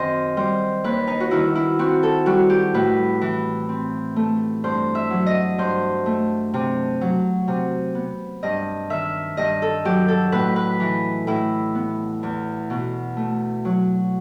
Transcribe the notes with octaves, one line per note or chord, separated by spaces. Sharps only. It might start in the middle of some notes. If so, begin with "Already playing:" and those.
Already playing: F#2 D#3 C4 C5 D#5
G3 C5
D#2 B4
D#4
F#4
D#3 E4
E4
C4 F#4
A4
G3 F#4
G4
A2 B4
E3
C4
A3
G2 C5
E5
F#3
D#5
G2 C5
A3
C3
F#3
C3
B3
G2 D#5
D#3 E5
G2 D#5
A4
F#3 G4
A4
A2 B4
B4
E3
A2 E4
B3
E2
B2
A3
F#3